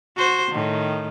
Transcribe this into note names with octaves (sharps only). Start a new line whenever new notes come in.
F#4 C5
A2 D#3